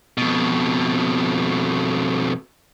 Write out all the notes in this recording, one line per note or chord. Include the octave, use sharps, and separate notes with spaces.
F2 B2